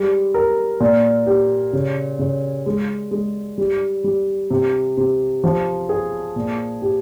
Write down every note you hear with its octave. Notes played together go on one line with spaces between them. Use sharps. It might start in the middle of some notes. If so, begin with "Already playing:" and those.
Already playing: G3 G#3
A#4
A#2
G4
C#3
C#3
G#3
G#3
G3
G3
C3
C3
F3
G#4
A#2
G4